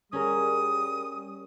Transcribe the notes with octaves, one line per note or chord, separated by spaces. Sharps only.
G3 C#4 G#4 A#4 D#6